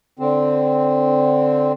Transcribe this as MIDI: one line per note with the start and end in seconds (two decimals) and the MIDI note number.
0.19 1.72 50
0.19 1.72 60